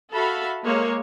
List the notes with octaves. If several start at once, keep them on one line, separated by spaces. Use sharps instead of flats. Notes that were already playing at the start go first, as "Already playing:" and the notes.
F#4 A4 E5 F5 B5
G#3 A#3 C#5